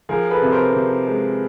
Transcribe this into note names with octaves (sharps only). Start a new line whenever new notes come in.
F3 G#4 A#4
A4 B4
C3
A#4 C5
C3
G#3